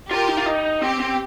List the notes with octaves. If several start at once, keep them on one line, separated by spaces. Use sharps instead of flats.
F4 G4 A#4
D#4
F4
D#4
C4 G4
C4